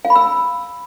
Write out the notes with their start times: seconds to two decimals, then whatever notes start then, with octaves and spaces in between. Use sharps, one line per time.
0.05 F5
0.10 B5
0.16 E6